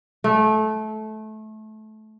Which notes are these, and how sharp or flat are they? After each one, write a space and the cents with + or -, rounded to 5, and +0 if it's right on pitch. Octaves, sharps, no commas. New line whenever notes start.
A3 -20